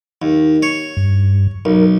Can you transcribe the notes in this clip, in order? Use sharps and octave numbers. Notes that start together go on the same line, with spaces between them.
D#2
C#5
G2
B1 A#4